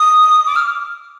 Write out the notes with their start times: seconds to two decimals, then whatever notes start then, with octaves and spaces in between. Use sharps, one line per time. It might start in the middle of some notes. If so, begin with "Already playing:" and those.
Already playing: D#6
0.46 D6
0.56 F6